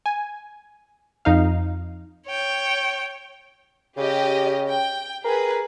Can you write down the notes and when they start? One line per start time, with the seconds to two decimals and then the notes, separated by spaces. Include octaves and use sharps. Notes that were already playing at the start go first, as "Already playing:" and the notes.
0.06 G#5
1.25 F2 D#4 F5
2.28 C#5 G5
3.97 C#3 G4 D#5
4.69 G5
5.24 G#4 A#4 B4